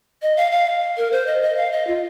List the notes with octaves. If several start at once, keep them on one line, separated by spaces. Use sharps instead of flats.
D#5
F5
F5
A#4
C5
D#5
D#5
F5
D#5
F4